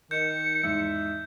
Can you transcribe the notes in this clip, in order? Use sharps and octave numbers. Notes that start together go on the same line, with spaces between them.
D#3 G6 C#7
E2 G#2 D#4 E5